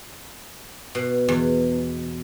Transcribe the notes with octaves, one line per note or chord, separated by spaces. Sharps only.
B2
E2